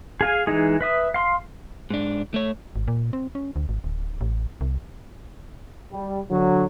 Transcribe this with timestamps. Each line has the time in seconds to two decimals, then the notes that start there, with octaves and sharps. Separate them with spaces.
0.21 G#4 F5 G#5
0.47 E3 G#3 D#4 G#4
0.81 B4 E5 D#6
1.14 F5 C6
1.90 G#2 D4
2.34 A3 C#5
2.76 G#1
2.88 A#2
3.13 C4
3.35 C#4
3.56 D2
3.69 G#1
3.84 D1
4.21 A1
4.61 C2
5.92 G3
6.30 D3 F#3